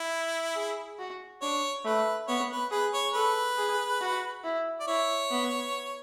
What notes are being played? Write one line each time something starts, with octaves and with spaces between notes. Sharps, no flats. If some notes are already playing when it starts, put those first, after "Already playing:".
Already playing: E4
G#4
F#4
D4 C#5
A3 B4
B3 C#5
B4
G#4 B4
C#5
A4 B4
G#4
F#4
E4
D5
E4 C#5
B3